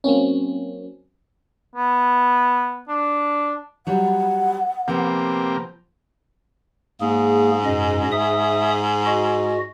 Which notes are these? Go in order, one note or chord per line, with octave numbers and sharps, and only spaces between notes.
F#3 A#3 C4 C#4
B3
D4
F#3 G3 F#5
C3 F3 A#3 B3 G4
G#2 A#3 G#4
F#2 B2 D#5
E5 D#6
F#4 D#5